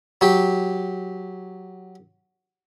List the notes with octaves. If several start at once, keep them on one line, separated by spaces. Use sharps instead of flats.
F#3 G4